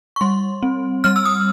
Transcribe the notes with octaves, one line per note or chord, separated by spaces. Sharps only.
C#6
G3 C6
C4
G3 F6
E6
D#6